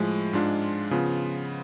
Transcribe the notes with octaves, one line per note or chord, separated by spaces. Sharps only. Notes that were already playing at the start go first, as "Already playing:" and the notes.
Already playing: A2 F3 G#3
G#2 G#3 D4 F4
C#3 F3 B3 F4